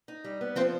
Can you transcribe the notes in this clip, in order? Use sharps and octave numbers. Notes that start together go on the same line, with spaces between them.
D#4
G3
B3
F3 C4 C5